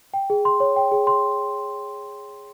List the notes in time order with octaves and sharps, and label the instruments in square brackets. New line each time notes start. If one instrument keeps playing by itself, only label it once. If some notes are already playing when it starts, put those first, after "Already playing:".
[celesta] G5
G#4
C6
C#5
G5
G#4
C6